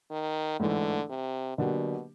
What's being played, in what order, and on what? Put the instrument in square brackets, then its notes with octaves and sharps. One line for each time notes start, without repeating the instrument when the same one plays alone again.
[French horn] D#3
[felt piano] A1 G#2 E3 A3 [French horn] D3
[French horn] C3
[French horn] B2 [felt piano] D3 F#3 A#3 D4 G4